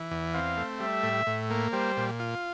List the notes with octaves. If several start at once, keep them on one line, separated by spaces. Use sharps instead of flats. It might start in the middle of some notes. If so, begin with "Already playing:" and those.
Already playing: E3
E2
C4 F5
A3
G3 E5
A2
A2
A#3
G3 C5
A#2
F4